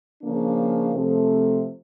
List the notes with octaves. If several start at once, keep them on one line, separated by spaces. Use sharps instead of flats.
C#3 F3 A#3 D4
C3 F3 A3